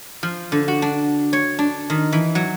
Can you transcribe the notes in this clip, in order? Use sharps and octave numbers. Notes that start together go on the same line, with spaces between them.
F3
D3
F#4
D4
C#5
D4
D#3
E3
F#3